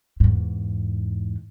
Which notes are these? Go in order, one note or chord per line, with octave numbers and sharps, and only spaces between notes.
E2 G#2